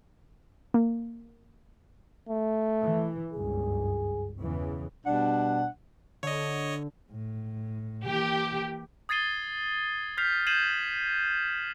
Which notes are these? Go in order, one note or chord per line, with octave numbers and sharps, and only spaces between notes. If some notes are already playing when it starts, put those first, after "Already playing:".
A#3
A3
E3
G1 C#2 F#2 G#4
E2 C#3 E3
B2 G3 D4 F#5
D3 C#5 D#5
A2
E3 A#3 G4
D#6 G#6 A6 C7 D#7 G7
F6 G6 B6 C7 F7
G6 G#6 C7 D#7 E7 F#7